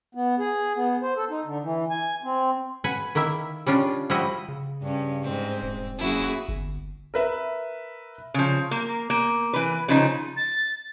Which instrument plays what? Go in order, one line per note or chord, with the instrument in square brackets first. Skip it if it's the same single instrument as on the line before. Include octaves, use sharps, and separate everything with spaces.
[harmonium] B3
G#4
B3
C5
A4
D#4
D3
E3
G#5
C4
[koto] B4 F#5 G#5
D#3 A#3 E4 E5
G3 C#4 D4 F4
F3 G3 E4 F#4 D#5
[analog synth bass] C#3
[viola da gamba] G2 C#4
[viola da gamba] G#2 [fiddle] C4
[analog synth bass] E1
[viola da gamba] F#2 A#3 G#4 [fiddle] E4 F#4
[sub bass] G1
[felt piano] A#4 B4 E5
[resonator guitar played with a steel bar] C#3 F3
A#3
A#3
E3 B4
C#3 F3 D#4
[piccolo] A6